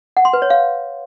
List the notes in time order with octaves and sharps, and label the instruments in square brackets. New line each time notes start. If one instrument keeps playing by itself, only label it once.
[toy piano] F#5
C6
B4
C#5
F5